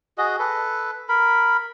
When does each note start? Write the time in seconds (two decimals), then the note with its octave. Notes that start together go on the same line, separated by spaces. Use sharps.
0.18 F#4 G#4 D#5
0.39 A4 B4
1.09 A#4 B5